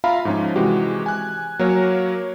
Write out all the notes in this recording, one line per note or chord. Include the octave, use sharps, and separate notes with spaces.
F4 E5 F5 A#5 B5
G#2 F3 C#4
C3 E3 G#3 F#4 G4
G#5 F#6
F#3 A#3 A#4 C#5